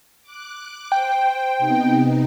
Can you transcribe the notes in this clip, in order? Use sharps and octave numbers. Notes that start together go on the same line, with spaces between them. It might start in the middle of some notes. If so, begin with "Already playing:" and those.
D6 F#6
C5 G5
C3 B3 D#4